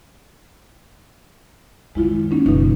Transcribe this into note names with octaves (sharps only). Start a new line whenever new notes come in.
F#2 D#3 G#3 E4 F4
A#3 C#4 D#4
F#1 B2 E3 G3 D#4